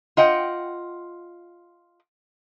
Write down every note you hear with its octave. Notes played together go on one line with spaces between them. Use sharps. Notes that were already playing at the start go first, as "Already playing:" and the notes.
F4 D#5 F#5 G5